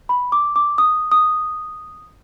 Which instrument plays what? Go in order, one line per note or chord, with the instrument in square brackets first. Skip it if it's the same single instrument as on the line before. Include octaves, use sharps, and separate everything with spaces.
[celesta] B5
D6
D6
D#6
D#6